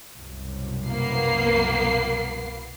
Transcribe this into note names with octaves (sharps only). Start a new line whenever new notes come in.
C2 F#2 B2
A#3 B3 C7